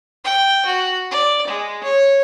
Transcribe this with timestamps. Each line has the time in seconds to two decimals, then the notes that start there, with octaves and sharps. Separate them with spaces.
0.24 G5
0.66 F#4
1.11 D5
1.47 G#3
1.84 C#5